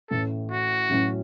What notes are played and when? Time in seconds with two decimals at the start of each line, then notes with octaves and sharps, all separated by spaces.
0.10 A1 A2 A3 A4
0.50 F#4
0.89 A1 A2 F#3 C#4